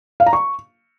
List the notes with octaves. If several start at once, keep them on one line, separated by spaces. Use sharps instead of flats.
F5
A#5
C#6